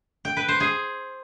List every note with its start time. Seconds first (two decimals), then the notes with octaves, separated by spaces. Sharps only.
0.25 G5
0.37 B4
0.48 C5
0.60 G#4